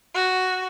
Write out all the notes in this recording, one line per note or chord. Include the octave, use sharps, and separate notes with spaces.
F#4